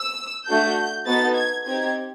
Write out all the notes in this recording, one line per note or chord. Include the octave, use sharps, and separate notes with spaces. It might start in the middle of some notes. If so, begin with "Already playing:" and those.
Already playing: E6
A3 D4 F#4 A4 G6
B3 D#4 F#4 A4 A6
G#6
C4 D#4 G4 G#6